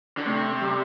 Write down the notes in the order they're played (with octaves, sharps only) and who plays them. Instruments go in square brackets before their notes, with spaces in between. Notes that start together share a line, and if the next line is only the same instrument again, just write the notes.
[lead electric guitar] D3
[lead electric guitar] C3 [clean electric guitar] A3
[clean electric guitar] G3